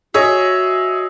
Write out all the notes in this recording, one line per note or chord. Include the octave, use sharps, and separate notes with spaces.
F#4 G#4 C#5 D#5 E5